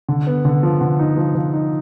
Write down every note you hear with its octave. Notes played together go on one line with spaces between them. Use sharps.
D3
B3
D3
F3
D3
D#4
F3
F3
D#4